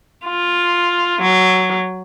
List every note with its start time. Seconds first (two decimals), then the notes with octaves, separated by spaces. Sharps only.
0.25 F4
1.21 F#3